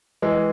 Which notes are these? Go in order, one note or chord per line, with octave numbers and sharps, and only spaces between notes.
E3 G#3